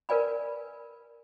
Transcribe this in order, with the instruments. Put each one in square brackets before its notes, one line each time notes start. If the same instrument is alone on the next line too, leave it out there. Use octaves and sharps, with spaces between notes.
[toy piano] A#4 B4 D5 G#5 B5